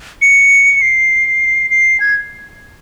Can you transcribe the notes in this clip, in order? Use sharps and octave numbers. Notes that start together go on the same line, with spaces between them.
C#7
C7
C7
G#6